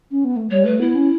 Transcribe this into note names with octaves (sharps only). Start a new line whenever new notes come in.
C#4
B3
A3
G3 C#5
A3 B4
B3 E4
C#4